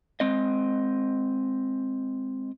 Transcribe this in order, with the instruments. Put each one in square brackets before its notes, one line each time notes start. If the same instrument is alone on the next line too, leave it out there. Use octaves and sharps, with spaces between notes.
[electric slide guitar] G#3 C4 D#5